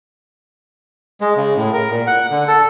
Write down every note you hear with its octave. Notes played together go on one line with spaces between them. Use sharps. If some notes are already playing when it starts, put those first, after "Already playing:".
G#3
C#3
A2
A#4
A#2
F#5
D3
A4